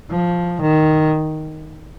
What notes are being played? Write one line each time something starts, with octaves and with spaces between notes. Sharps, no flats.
F3
D#3